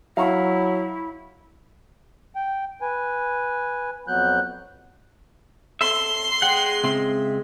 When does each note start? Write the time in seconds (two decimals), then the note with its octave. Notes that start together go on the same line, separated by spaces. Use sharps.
0.17 F#3 E4 F5 A#5 C#6
2.36 G5
2.81 B4 G#5
4.08 F2 F#3 B3 F#6 G6
5.81 A4 E5 C6
6.42 G#3 F#5 G5
6.84 C#2 C4 E5